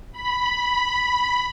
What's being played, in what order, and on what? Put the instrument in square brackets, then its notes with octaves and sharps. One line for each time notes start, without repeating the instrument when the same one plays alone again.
[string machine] B5